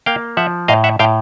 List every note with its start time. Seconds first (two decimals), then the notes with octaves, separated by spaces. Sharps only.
0.06 A#3 F5 G5
0.37 F3 E5 F#5
0.68 A2 D#5 F5
0.84 E5 F#5
0.99 A2 F5 G5